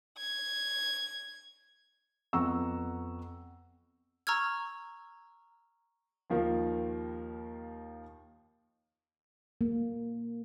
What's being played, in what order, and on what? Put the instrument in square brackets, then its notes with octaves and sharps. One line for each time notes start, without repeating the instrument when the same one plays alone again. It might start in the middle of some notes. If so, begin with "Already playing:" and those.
[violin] G#6
[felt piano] F2 B3 F#5 A#5 C#6 E6
[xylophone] A#5 C#6 E6 F6 G#6
[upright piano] D#2 D#3 F3 A#3
[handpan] A#3